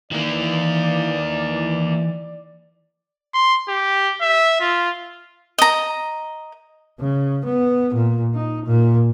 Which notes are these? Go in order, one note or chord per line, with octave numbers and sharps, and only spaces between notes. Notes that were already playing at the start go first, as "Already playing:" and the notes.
D#3 E3 A#3 D5
C6
G4
E5
F4
D#5 A#5
C#3
B3
A#2
D#4
A#2